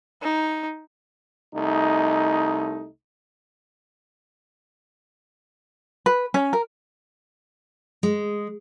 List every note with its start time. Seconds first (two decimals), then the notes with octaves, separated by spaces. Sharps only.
0.22 D#4
1.54 C2 A3 D#4
6.06 B4
6.34 C#4
6.53 A#4
8.03 G#3